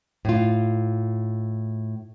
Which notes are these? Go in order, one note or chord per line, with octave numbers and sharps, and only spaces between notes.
A2 F4